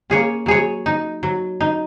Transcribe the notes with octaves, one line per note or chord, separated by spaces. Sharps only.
A#3 C#4 G#4 C#5
F#3 G#4 C#5
D#4
F#3
D#4